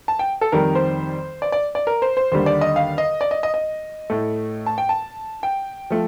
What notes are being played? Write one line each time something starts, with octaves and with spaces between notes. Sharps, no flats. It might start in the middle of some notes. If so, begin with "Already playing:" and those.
A5
G5
A4
F2 D#3 G3 A#4
C5
D5
D5
D5
A#4
C5
C5
D#2 D3 G3 C5
D5
D#5
F5
D#5
D5
D#5
D#5
D#5
A2 A3
A5
G5
A5
G5
F3 A3